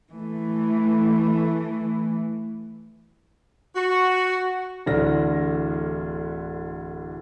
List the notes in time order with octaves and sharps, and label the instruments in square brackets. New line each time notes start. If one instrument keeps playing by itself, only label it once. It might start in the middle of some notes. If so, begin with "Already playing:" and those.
[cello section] E3 A3
[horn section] F#4
[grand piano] D1 D3 E3 D4 F6 A#6